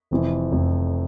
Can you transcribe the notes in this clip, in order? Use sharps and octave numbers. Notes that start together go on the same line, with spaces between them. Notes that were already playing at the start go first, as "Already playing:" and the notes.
F1 F2 E3
F1 F2 E3